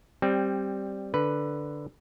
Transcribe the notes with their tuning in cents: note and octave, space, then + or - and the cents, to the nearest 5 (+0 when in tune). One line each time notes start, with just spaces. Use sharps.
G3 +0 C4 +10
D3 +0 B4 +0